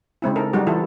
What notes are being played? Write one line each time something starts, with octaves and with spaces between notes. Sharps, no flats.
C#3 G#3 C4 E4
D#4 A4 A#4
F#3 G3 D#4 F#4 G#4
E3 E4 F4 A4